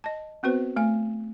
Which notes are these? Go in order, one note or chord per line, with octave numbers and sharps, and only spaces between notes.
D#5 A5
B3 C4 F#4 B4 C5
A3 G#5